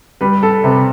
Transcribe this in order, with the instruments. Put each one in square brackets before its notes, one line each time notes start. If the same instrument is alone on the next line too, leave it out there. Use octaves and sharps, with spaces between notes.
[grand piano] G3 [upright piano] B4
[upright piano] A4
[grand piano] C3 [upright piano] B4